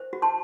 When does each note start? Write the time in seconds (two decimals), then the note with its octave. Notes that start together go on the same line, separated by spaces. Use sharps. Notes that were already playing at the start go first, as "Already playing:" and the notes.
Already playing: C5
0.13 F#4
0.22 A5 C6